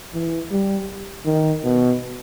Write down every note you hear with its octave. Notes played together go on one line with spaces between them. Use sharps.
E3
G3
D#3
B2